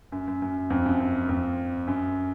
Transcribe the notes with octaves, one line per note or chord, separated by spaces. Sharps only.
F#2
F#2
F#2
F2
F#2
F#2
F2
F#2